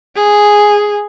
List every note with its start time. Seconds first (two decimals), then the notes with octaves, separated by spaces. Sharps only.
0.16 G#4